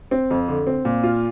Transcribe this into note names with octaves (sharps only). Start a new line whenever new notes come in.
C4
F2
D3
C4
A#2
F4